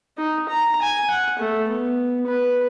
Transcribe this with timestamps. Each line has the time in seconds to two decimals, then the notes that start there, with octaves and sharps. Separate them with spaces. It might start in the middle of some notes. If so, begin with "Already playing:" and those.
0.18 D#4
0.49 A#5
0.82 G#5
1.10 F#5
1.39 A3
1.68 B3
2.27 B4